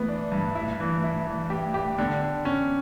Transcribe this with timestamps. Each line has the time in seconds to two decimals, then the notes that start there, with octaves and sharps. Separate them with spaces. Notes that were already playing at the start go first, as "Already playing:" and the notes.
Already playing: E3 A3 B3
0.08 D4
0.32 G2
0.55 E4
0.80 E3
1.04 E4
1.27 E3
1.50 G4
1.74 G4
1.98 D3 B3
2.21 D3
2.45 C#4